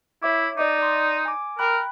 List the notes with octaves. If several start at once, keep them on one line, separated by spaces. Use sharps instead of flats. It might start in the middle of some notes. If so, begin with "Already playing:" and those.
E4 C#5 E5 D6
D#4 D5 D#5 D6
D5 C6
G#5 D6
A#4 G5 B5 F#6